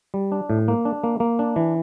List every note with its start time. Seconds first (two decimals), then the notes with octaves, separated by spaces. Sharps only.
0.14 G3
0.32 D4
0.50 A2
0.68 A#3
0.85 D4
1.04 A#3
1.20 A#3
1.39 D4
1.56 E3